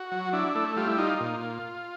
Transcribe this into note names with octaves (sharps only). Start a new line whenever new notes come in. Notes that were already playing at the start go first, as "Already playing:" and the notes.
Already playing: F#4
F#3
D4 E4
A3
G3 F4
E4
D#4 F4
A#2